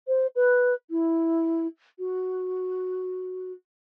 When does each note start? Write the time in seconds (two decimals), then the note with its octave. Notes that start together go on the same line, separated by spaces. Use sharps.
0.07 C5
0.35 B4
0.90 E4
1.99 F#4